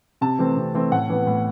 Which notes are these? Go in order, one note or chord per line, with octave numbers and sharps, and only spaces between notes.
C3 A5
E3 A3 C4
C3
E3 A3 C4
A2 F#5
E3 B3
A2